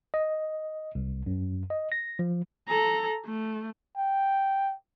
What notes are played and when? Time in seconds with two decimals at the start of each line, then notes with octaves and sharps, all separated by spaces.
0.14 D#5
0.95 C2
1.26 F#2
1.70 D#5
1.92 A#6
2.19 F3
2.68 A4 A#5
3.26 A3
3.97 G5